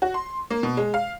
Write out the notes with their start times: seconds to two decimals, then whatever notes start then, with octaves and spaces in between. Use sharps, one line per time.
0.02 F#4
0.14 C6
0.50 A#3
0.63 B2
0.77 G#3
0.94 F5